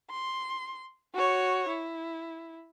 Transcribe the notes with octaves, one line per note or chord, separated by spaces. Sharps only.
C6
F#4 C#5
E4